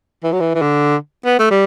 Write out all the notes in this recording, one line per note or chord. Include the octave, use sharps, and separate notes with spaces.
E3
F#3
E3
E3
D3
B3
A3
G3